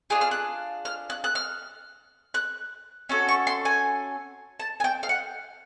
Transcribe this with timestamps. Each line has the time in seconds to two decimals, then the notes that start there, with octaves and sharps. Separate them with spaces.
0.10 D4 F4 G#4 F#6
0.21 F6
0.31 F#6
0.85 F6
1.10 F#6
1.24 F#6
1.35 F6
2.34 F#6
3.09 C#4 F#4 A4
3.28 C#6
3.47 C6
3.65 G#5
4.60 A5
4.80 G#5
4.84 G5
5.03 F5
5.09 F#5